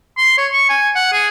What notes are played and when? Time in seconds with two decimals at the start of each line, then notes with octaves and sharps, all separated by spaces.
0.17 C6
0.38 C#5
0.53 C#6
0.69 G#5
0.95 F#5
1.12 G#4